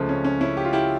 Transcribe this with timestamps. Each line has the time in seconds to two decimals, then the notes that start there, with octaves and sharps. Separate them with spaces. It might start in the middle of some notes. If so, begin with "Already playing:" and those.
Already playing: C#2 C#3 F3 A3
0.09 C#4
0.24 C#4
0.41 C#4 E4
0.57 G4
0.65 F4
0.73 E4 G4